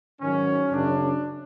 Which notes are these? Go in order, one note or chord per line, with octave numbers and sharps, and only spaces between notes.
G#2 D#3 F#3 C#4
F#2 C#3 F#3 D4